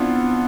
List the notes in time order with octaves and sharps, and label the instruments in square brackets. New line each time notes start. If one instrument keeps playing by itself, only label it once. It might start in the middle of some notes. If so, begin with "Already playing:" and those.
Already playing: [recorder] B3 [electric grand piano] C4 D4 E4 F4